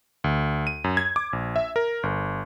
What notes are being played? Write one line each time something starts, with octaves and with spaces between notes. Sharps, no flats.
D2
D#7
F#2
G#6
D6
A#1
E5
A#4
G1